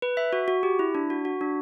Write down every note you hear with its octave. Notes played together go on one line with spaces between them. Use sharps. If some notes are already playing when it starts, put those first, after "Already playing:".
B4
E5
F#4
F#4
G4
E4
D4
F#4
F#4
D4